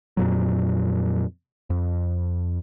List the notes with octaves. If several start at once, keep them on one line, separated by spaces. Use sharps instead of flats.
F2 A#2 F#3
F2